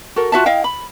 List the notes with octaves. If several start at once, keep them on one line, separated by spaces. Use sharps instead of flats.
F#4 A4 A#4
F4 F#4 E5 A5
E4 D#5 F5 G5
B5